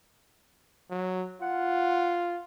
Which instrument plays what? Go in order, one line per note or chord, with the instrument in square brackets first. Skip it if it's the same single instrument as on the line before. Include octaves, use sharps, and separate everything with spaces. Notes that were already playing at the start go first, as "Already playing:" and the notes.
[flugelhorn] F#3
[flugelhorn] F4 [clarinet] F#5